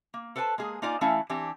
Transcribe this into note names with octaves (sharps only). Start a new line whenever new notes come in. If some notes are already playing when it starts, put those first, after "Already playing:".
A#3
A4 B4 C5 G5 A5
G#3 A#3 G#4
A#3 D#4 F4 D5 D#5 G#5
E3 A3 C#4 E4 F5
E3 C4 D4 G4